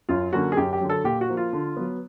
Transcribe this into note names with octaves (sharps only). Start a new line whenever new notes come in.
F#2 F4
D3 F#3 A#3 C#4 F#4
G#4
F#2 G4
G4
D3 F#3
A4
A#2 G4
F#4
F3 A#3
F4
D3
F#3 B3